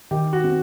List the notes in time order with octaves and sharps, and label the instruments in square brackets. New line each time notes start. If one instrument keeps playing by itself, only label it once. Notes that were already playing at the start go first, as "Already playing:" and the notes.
[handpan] D#3 [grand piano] G4
[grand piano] F#4
[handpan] C4